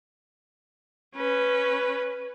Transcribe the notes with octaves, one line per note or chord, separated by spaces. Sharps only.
C#4 B4